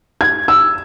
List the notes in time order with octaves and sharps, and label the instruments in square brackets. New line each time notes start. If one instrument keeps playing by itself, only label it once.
[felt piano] G#6
E6